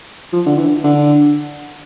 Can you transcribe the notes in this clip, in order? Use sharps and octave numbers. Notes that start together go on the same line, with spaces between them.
F3
D3
E3
D3